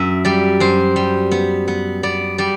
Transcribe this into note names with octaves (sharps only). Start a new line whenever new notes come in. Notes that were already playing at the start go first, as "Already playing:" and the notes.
Already playing: F#2 E5
G3 D5
F#2 C5
G3
B3
B3
B3 D5
G3 D5